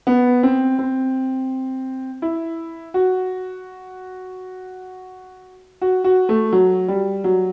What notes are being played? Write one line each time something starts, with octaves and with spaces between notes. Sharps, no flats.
B3
C4
C4
E4
F#4
F#4
F#4
A3
F#3
G3
F#3